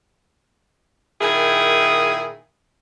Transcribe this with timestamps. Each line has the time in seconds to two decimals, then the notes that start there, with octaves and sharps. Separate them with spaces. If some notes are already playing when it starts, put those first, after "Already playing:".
1.21 A#2 D#3 E4 G#4